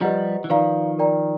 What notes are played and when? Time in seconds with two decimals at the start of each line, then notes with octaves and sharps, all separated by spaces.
0.01 F3 G3 G4 B4 D#5 F#5 A#5
0.44 E3
0.50 D#3 F3 B4 D5 F5 A#5
0.99 A#4 D5 G5 A#5